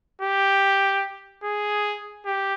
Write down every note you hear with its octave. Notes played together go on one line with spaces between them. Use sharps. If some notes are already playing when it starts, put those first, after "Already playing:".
G4
G#4
G4